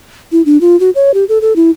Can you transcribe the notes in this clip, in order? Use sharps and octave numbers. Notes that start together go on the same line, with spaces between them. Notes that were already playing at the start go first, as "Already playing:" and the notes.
E4
D4
F4
F#4
C#5
G4
A4
A4
E4